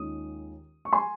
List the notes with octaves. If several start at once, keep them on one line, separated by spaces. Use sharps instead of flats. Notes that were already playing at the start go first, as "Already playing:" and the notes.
Already playing: D#2 D#3 G#3 C#4 F4 D#6
C#6
G#5 C6